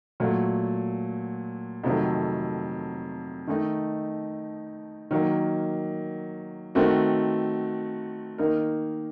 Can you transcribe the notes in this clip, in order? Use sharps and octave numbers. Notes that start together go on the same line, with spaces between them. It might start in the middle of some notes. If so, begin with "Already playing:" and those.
A#2 F#3 A3
F2 C3 D#3 F#3 A3
D#3 A3 D#4
D#3 F#3 A#3
D#3 A3 C4 F#4 A#4
D#3 A#3 D#4 A#4